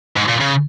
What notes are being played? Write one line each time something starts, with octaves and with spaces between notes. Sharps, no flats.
G#2
A#2
C#3